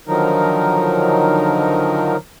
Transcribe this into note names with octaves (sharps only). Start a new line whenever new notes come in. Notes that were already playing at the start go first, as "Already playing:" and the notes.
D3 D#3 F3 F#3 D#4 A#4